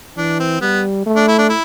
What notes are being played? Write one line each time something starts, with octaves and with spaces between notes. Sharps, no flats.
E3 D4
C4
G3 B3
A3
D4
E4
D4
E4